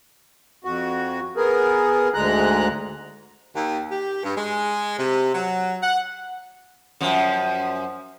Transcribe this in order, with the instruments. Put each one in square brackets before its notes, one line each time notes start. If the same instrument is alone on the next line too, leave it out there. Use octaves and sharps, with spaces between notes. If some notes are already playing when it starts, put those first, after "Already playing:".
[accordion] F2 F#4
B3 G#4 A#4
D2 G#2 D3 G#3 A#5 F#6
[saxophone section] D#2
G4
G2
G#3
C3
F#3
F#5
[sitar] F#2 F3